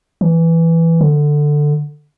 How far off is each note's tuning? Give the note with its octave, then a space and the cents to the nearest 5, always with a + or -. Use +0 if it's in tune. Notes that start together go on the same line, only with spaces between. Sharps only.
E3 +5
D3 +10